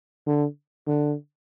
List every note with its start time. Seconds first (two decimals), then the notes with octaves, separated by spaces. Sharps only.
0.26 D3
0.87 D3